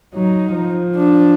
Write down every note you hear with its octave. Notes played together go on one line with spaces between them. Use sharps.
F#3 D#4
F3
D4